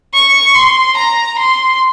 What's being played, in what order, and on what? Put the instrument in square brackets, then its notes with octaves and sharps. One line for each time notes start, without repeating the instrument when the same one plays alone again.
[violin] C#6
C6
A#5
C6